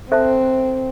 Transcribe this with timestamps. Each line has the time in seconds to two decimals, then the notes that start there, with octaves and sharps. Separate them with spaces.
0.12 C4 A4 C5 E5 A5